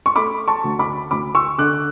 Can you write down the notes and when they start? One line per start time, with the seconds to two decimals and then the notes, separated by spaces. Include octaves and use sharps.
0.06 C#6
0.16 A3 B5 D6
0.48 A5 C#6
0.64 D2
0.79 B5 D6
1.11 D2 B5 D6
1.35 C#6 E6
1.58 D3 D6 F#6